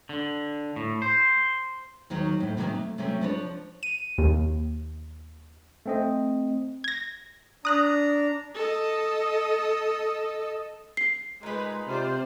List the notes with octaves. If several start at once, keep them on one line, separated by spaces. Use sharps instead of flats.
D3
A2
C5
D#2 D#3 F#3 C#5
F2 A2
C3 D#3 F#3 G3 A#3 C#4
A3
C3 F#3 A3 C#4
F3 D4 B4 C#5
D#7
D#2
A3 C4 D#5
G#6 A#6
D4 A#5 D#6 F#6 A#6
A4 D#5
C7
A#2 G#3 D#4 B4 B5
C3 F4 C5 D5